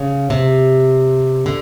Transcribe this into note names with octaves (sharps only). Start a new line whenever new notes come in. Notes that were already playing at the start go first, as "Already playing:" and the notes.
Already playing: C#3
C3
D3